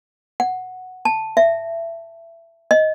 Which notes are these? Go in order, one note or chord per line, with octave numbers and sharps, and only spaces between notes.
F#5
A5
E5
D#5